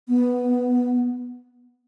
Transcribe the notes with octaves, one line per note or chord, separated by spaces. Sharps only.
B3